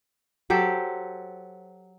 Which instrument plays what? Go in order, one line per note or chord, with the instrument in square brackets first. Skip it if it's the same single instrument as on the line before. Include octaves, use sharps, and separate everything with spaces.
[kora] F#3 G4 A4 C5